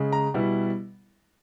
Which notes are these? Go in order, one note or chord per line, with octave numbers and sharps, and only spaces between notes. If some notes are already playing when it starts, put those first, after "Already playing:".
Already playing: C#3 G#3
A#5
B2 G3 B3 E4